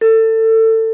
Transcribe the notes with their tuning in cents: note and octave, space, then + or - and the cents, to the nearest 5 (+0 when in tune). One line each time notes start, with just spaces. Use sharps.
A4 +25